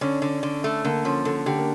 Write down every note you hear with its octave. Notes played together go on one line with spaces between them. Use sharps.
D3 C#4
D3
D3
A3
D3 A#3
F3 C#4
D3 A4
D3 G4
A#3